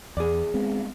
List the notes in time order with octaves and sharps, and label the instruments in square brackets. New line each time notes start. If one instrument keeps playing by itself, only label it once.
[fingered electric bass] E2 [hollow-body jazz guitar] G#4 D5
[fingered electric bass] G#3 B3 C4